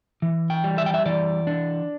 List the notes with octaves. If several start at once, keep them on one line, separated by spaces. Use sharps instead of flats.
E3
G5
G3
E5
G5
E5
E3 D5
D4